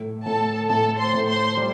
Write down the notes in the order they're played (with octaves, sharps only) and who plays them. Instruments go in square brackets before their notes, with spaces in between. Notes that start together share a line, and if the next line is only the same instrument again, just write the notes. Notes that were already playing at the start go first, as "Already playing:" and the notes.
Already playing: [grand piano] A2
[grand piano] A2 [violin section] A4 A5
[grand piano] A2 [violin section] A4 A5
[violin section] C5 C6
[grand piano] A2
[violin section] C5 C6
[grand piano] G3